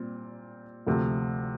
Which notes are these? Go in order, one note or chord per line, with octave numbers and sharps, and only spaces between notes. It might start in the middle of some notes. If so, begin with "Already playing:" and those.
Already playing: A#2 G3 C4
D2 C3 F3 A3